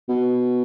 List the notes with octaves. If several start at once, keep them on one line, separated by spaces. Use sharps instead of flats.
B2